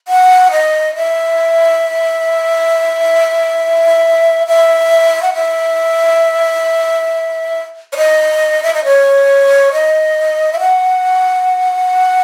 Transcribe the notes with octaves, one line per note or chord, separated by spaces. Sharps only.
F#5
D#5
E5
E5
F#5
E5
C#5
D#5
E5
D#5
C#5
D#5
E5
F#5